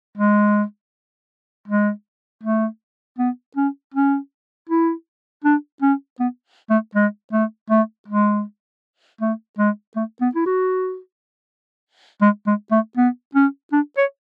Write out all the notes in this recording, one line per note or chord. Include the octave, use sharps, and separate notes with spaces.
G#3
G#3
A3
B3
C#4
C#4
E4
D4
C#4
B3
A3
G#3
A3
A3
G#3
A3
G#3
A3
B3
E4
F#4
G#3
G#3
A3
B3
C#4
D4
C#5